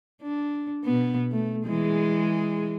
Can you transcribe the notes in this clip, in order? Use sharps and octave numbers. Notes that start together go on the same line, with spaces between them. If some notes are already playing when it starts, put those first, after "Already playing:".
D4
B2 B3
A3
E3 G#3 G#4